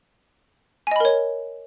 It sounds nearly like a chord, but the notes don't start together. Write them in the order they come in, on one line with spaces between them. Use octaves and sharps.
G#5 D#5 B5 A#4 C#5